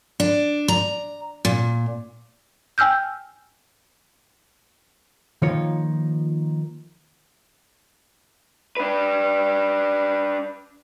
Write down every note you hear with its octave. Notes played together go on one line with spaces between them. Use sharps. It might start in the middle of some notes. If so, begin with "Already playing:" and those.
D4
A#5
A#2
G5 G#5 E6 F6 G6
D#3 F3 A#3 D#4 F4 C#5
D4 B4